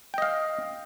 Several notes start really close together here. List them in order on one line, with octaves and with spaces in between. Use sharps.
G5 D#5 F5